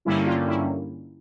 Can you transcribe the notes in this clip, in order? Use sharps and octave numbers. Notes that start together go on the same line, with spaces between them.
G2 D3 G3 A#3 C#4 E4
F4
E4